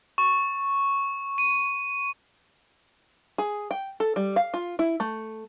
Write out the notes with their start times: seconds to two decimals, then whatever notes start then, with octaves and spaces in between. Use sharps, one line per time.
0.18 C#6
1.38 D#7
3.38 G#4
3.71 G5
4.00 A4
4.16 G3
4.36 F5
4.54 F4
4.79 E4
5.00 A3